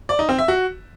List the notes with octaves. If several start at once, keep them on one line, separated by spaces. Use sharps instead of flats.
D5
D#4
C4
E5
F#4